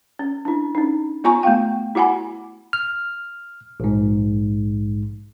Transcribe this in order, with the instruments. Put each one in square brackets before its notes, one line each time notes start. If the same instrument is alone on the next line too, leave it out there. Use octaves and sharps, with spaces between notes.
[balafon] C#4
D4 E4
C#4 D#4
B3 F4 G#5 A#5 C#6
A3 B3 F4 F5 G5
E4 F#4 F#5 G#5 B5
[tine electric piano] F6
A#1 G#2